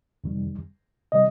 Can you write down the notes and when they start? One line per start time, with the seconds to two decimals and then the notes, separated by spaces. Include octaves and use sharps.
0.24 F2 C3 D#3 G3
1.12 C3 D#3 G3 D#5